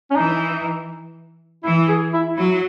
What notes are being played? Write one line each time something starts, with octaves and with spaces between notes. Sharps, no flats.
C#4
E3 D#4
E3 E4
G#4
E4
F#3 E4